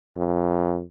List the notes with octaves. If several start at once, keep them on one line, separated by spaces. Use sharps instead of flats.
F2